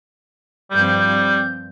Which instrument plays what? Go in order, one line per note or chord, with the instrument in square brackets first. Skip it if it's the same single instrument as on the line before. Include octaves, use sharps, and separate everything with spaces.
[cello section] G2 F3 C4 [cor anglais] G3 [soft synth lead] G6